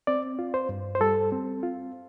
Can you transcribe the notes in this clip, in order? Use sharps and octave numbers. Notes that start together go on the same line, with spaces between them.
C4 D5
F4
C5
G2
C5
G3 A4
C4
F4